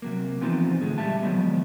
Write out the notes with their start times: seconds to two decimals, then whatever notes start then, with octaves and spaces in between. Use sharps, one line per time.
0.02 C3 F#3 A#3
0.41 E3 F3 B3 C4 D#4 F4
0.81 A2 D3 G#3
0.98 A#2 G3 E5 A5
1.22 D#3 F3 F#3 G#3 B3